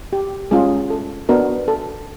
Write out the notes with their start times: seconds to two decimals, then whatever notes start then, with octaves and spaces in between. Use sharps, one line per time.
0.13 G4
0.51 G#3 C#4 F4 G#4
0.90 A4
1.29 B3 D4 F#4 A#4
1.68 A4